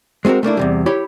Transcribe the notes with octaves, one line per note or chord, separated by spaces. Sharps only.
G#3 C4 F4 F#4 A#4
A3 A#3 D4 E4
E2 C3 G3
E4 G4 C#5 B5